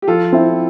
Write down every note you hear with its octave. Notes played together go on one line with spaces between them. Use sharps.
G4
F3 F4 A4
C4 E4